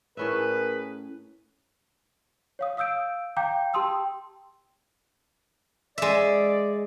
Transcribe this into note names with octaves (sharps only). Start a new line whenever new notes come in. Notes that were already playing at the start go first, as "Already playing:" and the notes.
A2 C#4 G#4 A#4 B4 E5
C#5 F5 D#6
F5 D#6 E6 G6 D7
F5 G5 A#5 D6 G6
G4 G5 A5 C6 D#6 E6
G#3 D5 E5